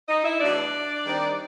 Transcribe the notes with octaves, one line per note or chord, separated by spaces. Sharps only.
D#4 D#5
E4 E5
E2 B2 F#3 A3 D4 D5
D#3 G3 C4 D#4